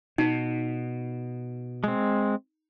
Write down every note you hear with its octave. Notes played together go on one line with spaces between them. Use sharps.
B2 D#4
G#3 C4